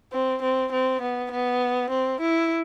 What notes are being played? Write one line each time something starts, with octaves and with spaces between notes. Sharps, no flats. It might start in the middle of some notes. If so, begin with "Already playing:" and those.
C4
C4
C4
B3
B3
C4
E4